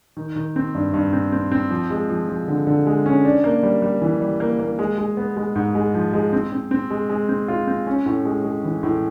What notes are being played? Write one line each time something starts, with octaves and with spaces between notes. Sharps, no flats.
D#3
D#3
C4
G2
G2
C4
C4
C4
F3
G#3
F3
F3
D3
D3
G#3
C#4
D4
A#3
G3
G3
E3
G3
A#3
A#3
G#3
G#3
B3
G#3
G#2
G#3
F3
G#3
C4
C4
C4
G#3
G#3
C4
F4
C4
C#4
A2
G#3
G#3
E3
A2